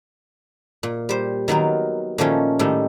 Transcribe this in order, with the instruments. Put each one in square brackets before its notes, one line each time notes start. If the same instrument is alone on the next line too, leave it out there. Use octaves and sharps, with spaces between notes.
[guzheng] A#2
G3 C5
D#3 F#3 B3 A#4
A#2 D#3 F3 A3 C#4
A2 D#3 G3 A3